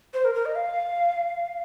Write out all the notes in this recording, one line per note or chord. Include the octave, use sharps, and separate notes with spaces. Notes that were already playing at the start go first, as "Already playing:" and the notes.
C5
A#4
A#4
D#5
F5